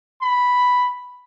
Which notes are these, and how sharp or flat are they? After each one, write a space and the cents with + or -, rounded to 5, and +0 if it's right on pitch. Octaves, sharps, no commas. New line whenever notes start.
B5 +0